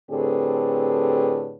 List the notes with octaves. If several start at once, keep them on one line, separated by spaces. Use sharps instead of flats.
A2 D3 C4 G4 G#4 B4